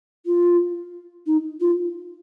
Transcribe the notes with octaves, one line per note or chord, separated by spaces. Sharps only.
F4
D#4
F4